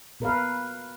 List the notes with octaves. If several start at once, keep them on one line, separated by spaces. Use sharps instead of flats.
B2 A#4 B4 F5